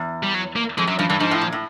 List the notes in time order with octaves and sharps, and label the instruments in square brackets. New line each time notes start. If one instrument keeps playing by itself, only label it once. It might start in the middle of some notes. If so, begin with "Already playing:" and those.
Already playing: [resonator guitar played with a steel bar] E2
[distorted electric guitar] G3
F#3
A#3
[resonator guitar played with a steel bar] F2 [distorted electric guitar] G#3
[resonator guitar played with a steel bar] F#2 [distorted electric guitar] F#3
[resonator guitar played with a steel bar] G2 [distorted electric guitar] F3
[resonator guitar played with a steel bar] G2 [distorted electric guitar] E3
[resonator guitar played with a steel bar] G#2 [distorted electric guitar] F3
[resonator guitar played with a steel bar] A2
A#2
A2